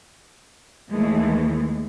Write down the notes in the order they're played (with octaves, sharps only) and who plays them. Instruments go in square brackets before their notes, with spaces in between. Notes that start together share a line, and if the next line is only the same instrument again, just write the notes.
[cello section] D#2 E3 G#3 A3